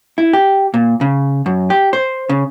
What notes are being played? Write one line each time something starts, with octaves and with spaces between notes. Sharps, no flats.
E4
G4
A#2
C#3
F#2
G4
C5
C#3